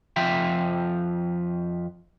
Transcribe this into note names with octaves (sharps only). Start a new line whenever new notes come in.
F2 F3 F4 E5 G5